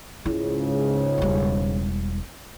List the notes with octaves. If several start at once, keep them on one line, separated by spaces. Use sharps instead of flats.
C#2 G#2 C#3 E4
E1 G3